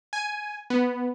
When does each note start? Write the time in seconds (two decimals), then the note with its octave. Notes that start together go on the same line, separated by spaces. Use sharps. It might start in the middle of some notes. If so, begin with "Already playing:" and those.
0.13 G#5
0.70 B3